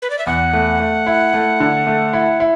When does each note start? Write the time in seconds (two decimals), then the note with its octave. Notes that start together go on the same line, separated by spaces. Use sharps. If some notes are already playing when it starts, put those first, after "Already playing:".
0.02 B4
0.10 D5
0.19 E5
0.27 E2 F#5
0.53 A3
0.80 A3
1.06 E4
1.34 A3
1.60 D3
1.87 A3
2.13 E4
2.40 E4